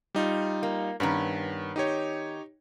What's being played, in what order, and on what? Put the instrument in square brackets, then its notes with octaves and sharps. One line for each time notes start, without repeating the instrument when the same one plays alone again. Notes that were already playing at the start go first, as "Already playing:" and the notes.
[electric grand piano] G3 D#4 F4
[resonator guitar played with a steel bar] A#3
[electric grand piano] G2 [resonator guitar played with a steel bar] D#3 B3 C#4
[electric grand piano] D#4 G4 C#5